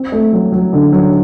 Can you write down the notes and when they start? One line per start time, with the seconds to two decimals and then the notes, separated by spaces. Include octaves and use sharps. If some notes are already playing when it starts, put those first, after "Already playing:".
Already playing: C4
0.12 A3
0.33 F#3
0.52 F#3
0.73 D3
0.93 F#3